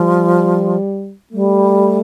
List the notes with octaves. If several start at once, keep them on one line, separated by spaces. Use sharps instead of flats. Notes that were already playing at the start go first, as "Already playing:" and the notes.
Already playing: F3 G3
G3 A3